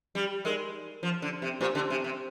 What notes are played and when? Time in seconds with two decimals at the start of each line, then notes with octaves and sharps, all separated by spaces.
0.15 G3
0.45 G#3 D#4 A#4 D5
1.03 F3
1.22 D3
1.42 C3
1.60 A#2 D4 G4 C5
1.75 D3
1.90 C3
2.04 C3